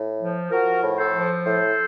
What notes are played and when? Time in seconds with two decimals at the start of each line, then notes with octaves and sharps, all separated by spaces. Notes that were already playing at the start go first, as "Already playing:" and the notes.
Already playing: A2
0.20 F3
0.51 F3 F#4 A#4
0.82 A2
0.98 A4 C5
1.13 F3
1.45 A2 A4 C5